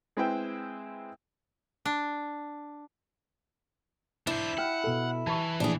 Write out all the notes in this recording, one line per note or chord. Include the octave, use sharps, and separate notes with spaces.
G#3 C4 E4 B4 C5 G5
D4
D4 E4 C5
F#5 G5 B5 F6
B2 A4
E3 A5 B5 C#6
A#1 A2 D4 G#4